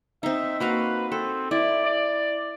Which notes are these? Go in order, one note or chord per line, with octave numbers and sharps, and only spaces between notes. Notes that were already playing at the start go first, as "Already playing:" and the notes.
C4 D#4 E5
A#3 F#4 B4 F5
C4 A4
E4 D5
D5